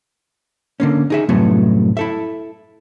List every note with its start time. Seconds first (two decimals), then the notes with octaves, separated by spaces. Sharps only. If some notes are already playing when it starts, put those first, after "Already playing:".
0.80 D3 A#3 C#4
1.10 D#4 G#4 E5
1.29 C2 F#2 A2 F#3 A3 B3
1.97 E4 A4 E5